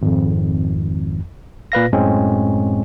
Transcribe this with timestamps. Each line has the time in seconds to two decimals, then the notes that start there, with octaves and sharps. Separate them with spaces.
0.02 G#1 F2
1.72 A#2 B4 F5 A#6
1.92 F#2 A2 G#3 C4 C#4